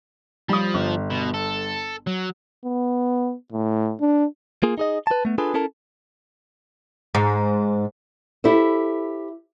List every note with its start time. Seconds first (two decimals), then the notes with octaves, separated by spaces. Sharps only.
0.49 F3 G3 D#6
0.74 G1
1.10 B2
1.34 A4
2.07 F#3
2.65 B3
3.52 A2
4.01 D4
4.63 A#3 F4 G#4
4.78 D#4 G#4 D#5
5.07 B4 A5
5.25 A3 B3
5.38 D4 F4 G#4 A4 B4
5.54 C#4 E4 A4 A#4 A5
7.15 G#2
8.44 E4 G4 A4 C5